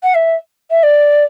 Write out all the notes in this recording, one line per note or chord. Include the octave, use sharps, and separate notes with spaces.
F#5
E5
E5
D5